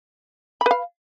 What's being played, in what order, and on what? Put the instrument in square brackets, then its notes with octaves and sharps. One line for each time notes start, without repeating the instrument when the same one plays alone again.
[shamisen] B5
B4
F5